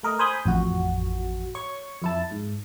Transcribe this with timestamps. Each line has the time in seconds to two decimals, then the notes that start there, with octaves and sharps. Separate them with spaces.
0.03 A3 A#4 D#5
0.19 C5 G#5 B5 D#6 G6
0.45 A1 F2 F#4
1.55 C#5 C#6
2.02 F2 E4 A5
2.31 G#2